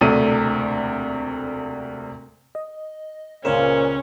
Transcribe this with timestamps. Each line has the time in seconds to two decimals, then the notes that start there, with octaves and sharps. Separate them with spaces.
0.01 E1 D2 C3 A3 D4 D#7
2.55 D#5
3.45 C#2 A#2 C#3 C#4 A#4 C5 F5 E7